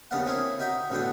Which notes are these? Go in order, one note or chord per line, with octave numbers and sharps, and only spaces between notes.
D#2 C#3 B3 D4 F5 F#5
C4 C#4 E4 G#4 A#4
D#4 F#4 E5 G5 A#5
A1 B2 D3 B3 D4 G5